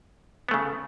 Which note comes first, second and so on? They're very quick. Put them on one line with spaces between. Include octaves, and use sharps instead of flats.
B3 A3 C#3